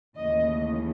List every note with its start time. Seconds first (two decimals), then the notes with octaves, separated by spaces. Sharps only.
0.17 D#2 C#3 E3 A3 D#5